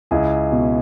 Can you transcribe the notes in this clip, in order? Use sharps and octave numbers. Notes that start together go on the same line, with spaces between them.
C#2 E4 G#4
B2